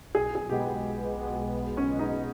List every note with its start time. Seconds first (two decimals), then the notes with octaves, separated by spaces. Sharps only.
0.15 B1 G#4
0.35 G#4
0.49 B2 G#3 B3 G4
0.84 B1
1.20 B2 G#3 B3
1.54 B1
1.77 C#4
1.89 B2 G#3 B3
1.99 D#4